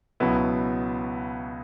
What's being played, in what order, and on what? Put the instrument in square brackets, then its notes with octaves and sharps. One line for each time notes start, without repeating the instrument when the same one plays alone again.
[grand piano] C#2 B2 F#3 B3 E4